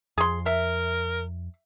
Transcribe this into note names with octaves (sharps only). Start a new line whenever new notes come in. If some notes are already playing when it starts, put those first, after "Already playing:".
F2 G#4 C6
A#4 E5